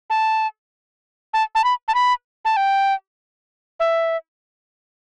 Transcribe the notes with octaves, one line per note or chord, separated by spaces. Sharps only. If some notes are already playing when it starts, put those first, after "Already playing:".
A5
A5
A5
B5
A5
B5
A5
G5
E5